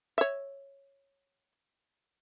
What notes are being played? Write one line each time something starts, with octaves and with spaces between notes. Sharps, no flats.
C#5 E5